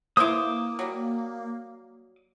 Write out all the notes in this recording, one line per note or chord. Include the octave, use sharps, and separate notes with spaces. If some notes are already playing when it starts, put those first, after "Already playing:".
A#3 E4 B4 C5 D6 D#6
F#3 G3